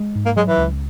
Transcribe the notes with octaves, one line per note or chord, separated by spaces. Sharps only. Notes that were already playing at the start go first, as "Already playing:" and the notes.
Already playing: G#3
G#2
A#3
F#3 G#3
E3
C#2